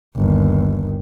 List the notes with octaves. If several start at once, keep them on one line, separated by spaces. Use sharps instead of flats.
G1 D#2